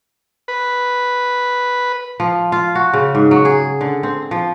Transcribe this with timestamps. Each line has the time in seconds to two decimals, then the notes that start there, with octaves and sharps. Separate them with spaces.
0.48 B4
2.20 F3
2.52 F4
2.75 F#4
2.93 C#3
3.15 G#2
3.31 F#3
3.45 G#4
3.81 D3
4.03 C4
4.31 F3